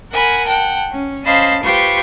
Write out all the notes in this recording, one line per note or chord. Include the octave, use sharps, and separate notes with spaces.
A#4 F#5 G#5 B5
F#5 G5 A5
C#4
C#4 C5 D#5 F5 A5 B5
F4 G4 B4 C5 C#6